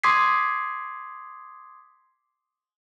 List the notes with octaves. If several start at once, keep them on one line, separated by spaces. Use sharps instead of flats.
C6 D6 D#6 G#6 B6 C7